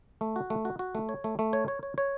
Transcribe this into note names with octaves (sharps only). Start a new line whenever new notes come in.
A3
F#4
A3
F#4
F#4
A3
C#5
A3
A3
C#5
C#5
C#5
C#5